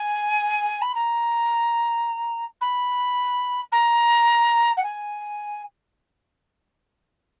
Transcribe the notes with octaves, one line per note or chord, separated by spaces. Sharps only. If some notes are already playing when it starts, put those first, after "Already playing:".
Already playing: G#5
B5
A#5
B5
A#5
F#5
G#5